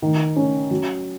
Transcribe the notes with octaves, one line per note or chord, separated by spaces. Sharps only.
D#3
C#4
F#3